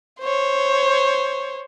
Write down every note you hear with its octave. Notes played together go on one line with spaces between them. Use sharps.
C5 C#5